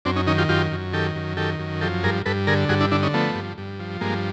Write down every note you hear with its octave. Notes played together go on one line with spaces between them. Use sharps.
F#2 C4 D4
C#4 D#4
D#3 C#4 D#4
F4 G4
F#2 F4 G4
F#2
D#3 G4 A4
F#2
D#3 G4 A4
F#2
F3 G4 A4
G2 G#4 A#4
G2 A4 B4
D3 G#4 A#4
G2 F#4 G#4
D4 E4
D3 D4 E4
C#4 D#4
F3 A3 B3
G2
G2
F3
G2 G#3 A#3